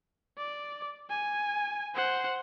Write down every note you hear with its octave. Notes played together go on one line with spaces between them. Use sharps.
D5
G#5
C5 F#5